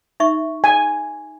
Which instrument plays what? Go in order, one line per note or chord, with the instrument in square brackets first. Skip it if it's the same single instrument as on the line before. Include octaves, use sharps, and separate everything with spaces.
[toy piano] D#4 E5 C#6
[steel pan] G#5